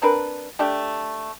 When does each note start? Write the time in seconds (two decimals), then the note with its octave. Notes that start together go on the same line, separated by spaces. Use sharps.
0.02 C4 D4 A#4 B4
0.59 A3 D4 G4